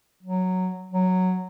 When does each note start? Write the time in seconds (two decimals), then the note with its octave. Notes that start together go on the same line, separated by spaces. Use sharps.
0.23 F#3
0.92 F#3